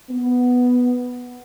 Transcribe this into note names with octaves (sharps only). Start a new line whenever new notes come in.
B3